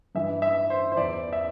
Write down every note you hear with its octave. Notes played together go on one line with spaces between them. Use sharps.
G2 E3 E5
E5
C5
C5
E2 E3 D5
E5